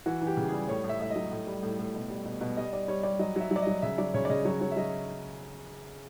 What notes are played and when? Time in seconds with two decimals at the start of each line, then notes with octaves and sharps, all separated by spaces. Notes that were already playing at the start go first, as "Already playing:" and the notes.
0.06 E3 F#4
0.21 E3
0.27 G4
0.37 C#3
0.48 G3 G#4
0.68 A2 C#5
0.84 A2
0.89 E5
1.00 A2 E5
1.10 D#5
1.16 F#3
1.31 A2
1.47 G3
1.63 A2
1.79 A2
1.94 B2
2.10 G3
2.25 B2
2.41 B2
2.57 G3 D#5
2.73 G3 D5
2.88 G3 C#5
3.03 G3 D5
3.19 F#3 D#5
3.36 F#3 E5
3.51 F#3 D5
3.62 F#3 D#5
3.82 C#3 E5
3.98 F#3 D5
4.14 C#3 C#5
4.25 D5
4.30 C#3 D#5
4.45 F#3 C#5
4.61 F#3 C#5
4.72 E5
4.76 F#3 D#5